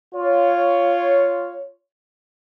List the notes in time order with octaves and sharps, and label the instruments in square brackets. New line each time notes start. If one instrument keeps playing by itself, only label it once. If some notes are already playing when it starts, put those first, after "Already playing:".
[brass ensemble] F4 C#5